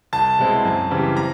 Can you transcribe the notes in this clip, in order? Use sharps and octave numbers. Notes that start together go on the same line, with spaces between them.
C2 A5
B2 G#3 C4 E4
F#2
C#3 E3 G3 C4
A#5